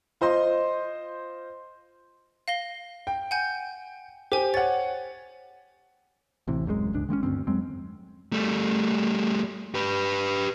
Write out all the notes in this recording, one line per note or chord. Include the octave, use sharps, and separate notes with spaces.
F4 C5 D#5 C6
F5 A#6 G7
G5
F#5 G#5 G6
G4 C5 G#5
C#5 F#5 A6
A1 C3 E3
D#1 F#2 C3 G#3
D1 G1 C#2 D4
D#3 G#3 A#3 C#4
D2 G2 G#3 C4
F2 F#3 G#3 C4
G3 A3
G4 B4